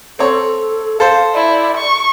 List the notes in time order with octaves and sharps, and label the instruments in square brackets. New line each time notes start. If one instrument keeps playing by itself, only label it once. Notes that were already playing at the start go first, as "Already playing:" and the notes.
[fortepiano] C4 C#5 [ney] A4
[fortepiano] A4 C5 [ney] F5
[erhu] E4 [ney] D5
[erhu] C#6